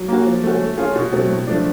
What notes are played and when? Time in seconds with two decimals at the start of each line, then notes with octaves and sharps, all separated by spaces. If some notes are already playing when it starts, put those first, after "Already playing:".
Already playing: F#3
0.08 A#3 C#4 F#4
0.27 F3
0.43 A3 C#4 F#4
0.61 A3
0.77 C#4 F4 G#4
0.96 B2
1.12 F#3 A3 C4
1.29 A2
1.47 F3 A3 D4